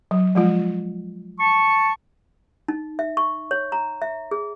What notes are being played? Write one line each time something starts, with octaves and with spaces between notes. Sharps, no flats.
F#3
F3 G#3 F4
A5 C#6
D#4
E5
C#6
C#5
A#5
E5
G#4